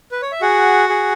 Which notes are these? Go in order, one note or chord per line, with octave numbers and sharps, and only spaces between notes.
B4
C#5
E5
F#4 G#4 F#5
G#4